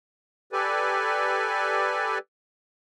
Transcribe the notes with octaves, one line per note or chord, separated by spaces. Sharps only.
G4 A4 B4 D5 G#5